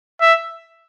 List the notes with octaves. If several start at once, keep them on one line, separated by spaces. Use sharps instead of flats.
E5